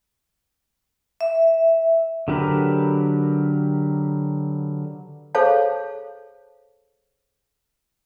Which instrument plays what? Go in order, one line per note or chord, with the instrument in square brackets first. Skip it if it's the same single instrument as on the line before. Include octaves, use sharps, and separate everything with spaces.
[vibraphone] E5
[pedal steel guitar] D3 F#3 G4 A#4 B4
[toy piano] G#4 A4 C5 C#5 F5 A5